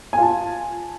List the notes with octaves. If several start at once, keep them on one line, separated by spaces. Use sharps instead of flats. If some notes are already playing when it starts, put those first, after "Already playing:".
F4 G#5 A5